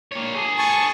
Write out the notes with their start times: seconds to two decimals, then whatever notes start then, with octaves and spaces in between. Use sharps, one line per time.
0.12 A#3 C#5
0.35 G#4 A4
0.58 G#5 A5 C#6